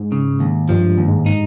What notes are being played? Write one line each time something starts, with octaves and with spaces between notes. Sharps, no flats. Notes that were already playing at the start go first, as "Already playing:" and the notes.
Already playing: G#2
C#3
D#2
G2 F3
G2
D#2
G#2
D#4